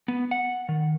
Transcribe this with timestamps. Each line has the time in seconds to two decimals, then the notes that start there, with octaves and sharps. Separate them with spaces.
0.08 B3
0.31 F#5
0.69 D#3